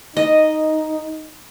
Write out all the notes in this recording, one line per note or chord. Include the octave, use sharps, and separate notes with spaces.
D#4 D#5